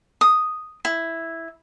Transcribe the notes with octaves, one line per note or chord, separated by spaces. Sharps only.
D#6
E4